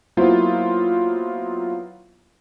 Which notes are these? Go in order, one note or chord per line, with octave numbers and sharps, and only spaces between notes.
F#3 A#3 B3 E4 F4 C5